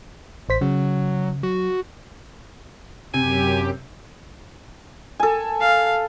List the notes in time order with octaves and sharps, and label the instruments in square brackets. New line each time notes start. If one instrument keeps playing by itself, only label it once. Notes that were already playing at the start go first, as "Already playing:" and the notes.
[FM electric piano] A1 C5 B6
[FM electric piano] C#3 [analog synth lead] F#3
[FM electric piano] F#3 [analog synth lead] F#4
[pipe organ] F#2 G4 [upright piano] C3 [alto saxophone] G#5
[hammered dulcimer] A4 G#5
[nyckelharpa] F5